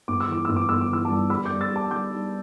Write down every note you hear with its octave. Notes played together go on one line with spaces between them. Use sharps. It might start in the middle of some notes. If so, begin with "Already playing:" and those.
G1 D6
E6
E3 D6
G1 E6
D6
G1 E6
D6
E3 E6
A5 D6
G2
G3 B5 E6
D6 G6
G2
E6 A6
G3
A5 D6
G3 D6 G6
G3